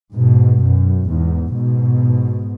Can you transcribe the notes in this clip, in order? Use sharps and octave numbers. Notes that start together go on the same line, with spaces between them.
G#2 B2
F#2
E2 G#2
G#2 B2